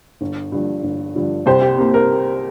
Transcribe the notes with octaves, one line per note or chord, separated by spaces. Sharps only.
G1
G2 D3 F3
G1
G2 D3 F3
C2 G4 C5
G4
C3 A#3
A#4